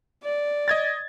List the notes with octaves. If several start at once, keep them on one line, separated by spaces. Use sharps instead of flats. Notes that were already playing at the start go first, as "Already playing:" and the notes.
D5
D#5 G#6 A6